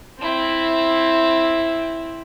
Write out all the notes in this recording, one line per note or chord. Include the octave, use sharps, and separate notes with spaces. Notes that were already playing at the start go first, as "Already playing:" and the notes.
C4 E4